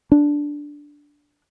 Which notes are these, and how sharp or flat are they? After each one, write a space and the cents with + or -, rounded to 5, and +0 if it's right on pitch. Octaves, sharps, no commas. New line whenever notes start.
D4 -5